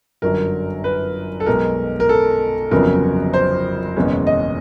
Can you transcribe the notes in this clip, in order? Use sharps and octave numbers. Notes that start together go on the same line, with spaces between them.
G1 F#2 D3 F#3 A#4
B4
A4
B1 B2 G#3 A#4
A#4
A4
G1 F2 C#3 F#3 B3 A#4
C5
F#1 E2 B2 G#3 C#4
D#5